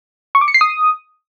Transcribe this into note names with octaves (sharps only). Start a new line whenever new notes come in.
C#6
D6
C#7
C7
D#6